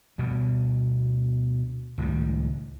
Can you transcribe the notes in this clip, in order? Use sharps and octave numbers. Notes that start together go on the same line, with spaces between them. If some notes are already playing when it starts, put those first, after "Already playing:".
D2 B2 G3 B3
C#2 A2 D#3 G3